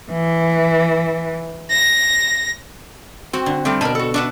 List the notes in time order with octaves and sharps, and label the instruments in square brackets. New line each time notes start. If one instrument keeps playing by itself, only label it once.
[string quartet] E3
A#6
[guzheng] C4 [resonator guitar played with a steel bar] F#4
[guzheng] D3
[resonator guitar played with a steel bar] G3 A3 C4 [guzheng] G4
[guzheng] B2 B5 [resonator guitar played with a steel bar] A#4 A5
[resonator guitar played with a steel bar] F#4 A4
[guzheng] D4 E5 F#5 [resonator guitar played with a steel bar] F#4 B4